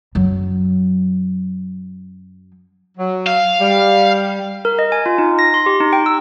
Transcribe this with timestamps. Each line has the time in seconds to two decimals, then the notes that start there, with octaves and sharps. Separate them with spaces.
0.15 F#2 F#3
2.98 F#3
3.27 F5
3.59 G3
4.65 A#4
4.79 D#5
4.92 G#5
5.06 F4
5.18 D#4
5.39 A#6
5.54 C6
5.66 G4
5.80 D#4
5.93 G5
6.06 E6